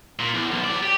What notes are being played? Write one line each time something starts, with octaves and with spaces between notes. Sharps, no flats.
A#2
E2
B1
F#3 D5
G4